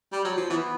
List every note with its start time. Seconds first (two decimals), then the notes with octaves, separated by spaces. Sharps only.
0.12 G3
0.25 F#3
0.37 F3
0.49 E3 B3